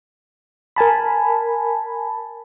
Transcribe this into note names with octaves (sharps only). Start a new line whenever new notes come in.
A#4 G#5 A5 B5